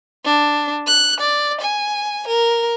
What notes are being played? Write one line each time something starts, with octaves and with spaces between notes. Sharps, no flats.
D4
F#6
D5
G#5
A#4